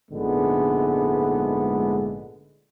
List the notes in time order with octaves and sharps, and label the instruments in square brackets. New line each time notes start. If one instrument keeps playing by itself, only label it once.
[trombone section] A#1 G#2 D3 G#3 A3 B3